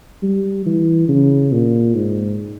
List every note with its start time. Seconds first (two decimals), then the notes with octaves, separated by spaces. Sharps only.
0.22 G3
0.66 E3
1.08 C#3
1.52 A#2
1.95 G#2